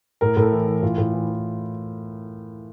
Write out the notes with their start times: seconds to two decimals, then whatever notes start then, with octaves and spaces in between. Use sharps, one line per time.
0.21 A2 A#4
0.37 A2
0.42 A4
0.53 E3
0.68 E3
0.83 A2 F4
0.98 A2
1.13 E3
1.28 E3